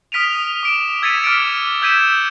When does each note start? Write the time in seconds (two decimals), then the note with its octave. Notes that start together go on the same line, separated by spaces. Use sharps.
0.12 D#6 F6 B6 D7 D#7 F7
0.63 D6 D7 E7
1.02 E6 G#6 A6 B6 C#7 D#7
1.24 D6 F6 B6 D7
1.82 E6 G6 G#6 B6 D#7 E7